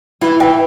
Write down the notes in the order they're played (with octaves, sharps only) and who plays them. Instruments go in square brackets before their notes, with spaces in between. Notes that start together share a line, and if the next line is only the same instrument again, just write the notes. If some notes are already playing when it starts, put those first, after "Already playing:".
[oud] E3 [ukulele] E4
[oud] E3 [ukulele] G5